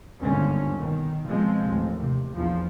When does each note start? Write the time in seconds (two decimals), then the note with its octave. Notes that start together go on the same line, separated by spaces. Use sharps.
0.19 G1 D#2 G#2 D3 C4 C#4
0.76 B2 D#3
1.27 B2 F3 G#3 C4
1.66 A1 D#2
2.00 C3
2.35 A#1 E2 F3